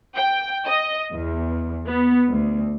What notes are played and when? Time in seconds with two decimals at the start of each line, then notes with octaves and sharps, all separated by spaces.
0.17 G5
0.65 D#5
1.13 E2
1.87 B3
2.29 D2